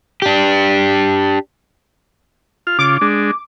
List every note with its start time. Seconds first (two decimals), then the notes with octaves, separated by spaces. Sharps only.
0.22 D4 G4
2.67 F4 F6
2.79 C#3 F4 D6
3.01 G#3 D4